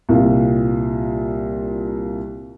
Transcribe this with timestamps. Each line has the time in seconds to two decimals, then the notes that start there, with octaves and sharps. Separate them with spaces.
0.09 C2 A#2 F4 F5